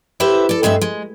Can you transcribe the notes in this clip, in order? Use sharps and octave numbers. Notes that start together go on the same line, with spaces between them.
E4 G4 B4 C5 E5
A4 D5
G2 G#3 C4 E5
G#3